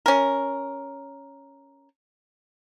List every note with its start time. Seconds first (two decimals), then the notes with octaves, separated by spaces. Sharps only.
0.06 C#4 A#4